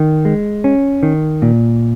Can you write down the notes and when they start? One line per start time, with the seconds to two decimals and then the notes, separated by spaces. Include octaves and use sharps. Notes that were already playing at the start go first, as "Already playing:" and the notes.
Already playing: D#3
0.25 G#3
0.64 C#4
1.03 D#3
1.42 A#2